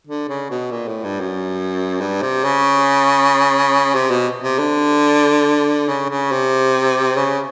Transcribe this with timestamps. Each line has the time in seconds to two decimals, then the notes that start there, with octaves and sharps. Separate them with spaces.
0.07 D3
0.29 C#3
0.50 B2
0.71 A#2
0.88 A2
1.04 G2
1.20 F#2
2.01 G2
2.22 C3
2.44 C#3
3.94 C3
4.11 B2
4.43 C3
4.59 D3
5.88 C#3
6.09 C#3
6.31 C3
7.17 C#3